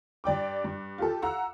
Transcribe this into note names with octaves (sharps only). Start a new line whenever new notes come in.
G2 D5 G5 D6
G2
F4 G4 A4
F5 F#5 A#5 E6